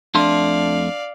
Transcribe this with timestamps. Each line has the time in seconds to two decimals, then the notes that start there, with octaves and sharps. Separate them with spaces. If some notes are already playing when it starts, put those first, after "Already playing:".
0.15 F2 A3 D4 D5 F5 C6